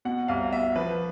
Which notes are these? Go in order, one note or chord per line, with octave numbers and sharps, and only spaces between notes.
B2 F#5
C2 F5
B2 E5
F3 B4